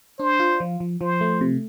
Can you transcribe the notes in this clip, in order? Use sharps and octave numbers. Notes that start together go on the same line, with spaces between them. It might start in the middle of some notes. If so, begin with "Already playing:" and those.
D4 C5
F4
F3
F3
F3 C5
A3
C3